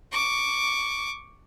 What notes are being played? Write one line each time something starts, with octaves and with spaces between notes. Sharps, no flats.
C#6 D6